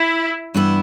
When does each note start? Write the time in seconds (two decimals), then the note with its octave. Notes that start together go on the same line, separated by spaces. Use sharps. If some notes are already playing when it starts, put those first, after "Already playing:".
Already playing: E4
0.54 G2 E3 B3 E4